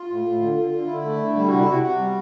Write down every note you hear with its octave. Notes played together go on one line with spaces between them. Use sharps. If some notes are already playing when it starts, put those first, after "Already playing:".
Already playing: F4
A2
A2
D3
D3
D3
D3 E4
A3
D3
G3 E4
C3 F#4
E4
C3 F#4
C3 F#4
G3